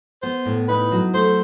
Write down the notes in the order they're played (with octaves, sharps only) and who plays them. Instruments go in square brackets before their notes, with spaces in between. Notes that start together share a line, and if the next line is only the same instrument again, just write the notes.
[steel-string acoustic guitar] B3 [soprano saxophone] C5
[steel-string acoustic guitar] A2
[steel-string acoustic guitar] D#4 [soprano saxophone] B4
[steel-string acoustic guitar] F#3
[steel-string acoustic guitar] A3 [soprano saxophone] C5